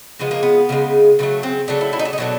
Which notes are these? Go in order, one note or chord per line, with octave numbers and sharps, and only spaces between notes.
C#3 F3 G#3 B3
A#3
B3
C#3 F3 G#3
C#3 F#3 A3 B3
C4
C#3 F#3 A3 D4
E4
E4
D#4
D4
D#4
B2 F#3 A3 D4